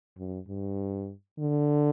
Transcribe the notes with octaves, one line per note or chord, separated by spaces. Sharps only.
F#2
G2
D3